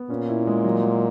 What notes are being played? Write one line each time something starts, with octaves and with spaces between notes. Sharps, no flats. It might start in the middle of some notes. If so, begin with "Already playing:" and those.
Already playing: B3
A#2 C#4
E4
G#3
F#3
F#3